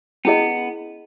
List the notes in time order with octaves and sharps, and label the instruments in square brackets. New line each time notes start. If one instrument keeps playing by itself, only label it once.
[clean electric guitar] B3 [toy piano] C#4 E4 G#4 D#5